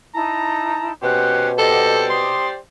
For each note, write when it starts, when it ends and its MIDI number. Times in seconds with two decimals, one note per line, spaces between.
0.15 0.93 63
0.15 0.93 64
0.15 0.93 81
0.15 0.85 82
1.03 2.33 47
1.03 1.49 61
1.03 1.49 67
1.03 1.49 72
1.03 1.48 78
1.03 1.48 90
1.58 2.55 67
1.58 2.05 69
1.58 2.55 72
1.58 2.55 74
1.58 1.96 75
1.58 1.96 78
2.10 2.49 84
2.10 2.48 87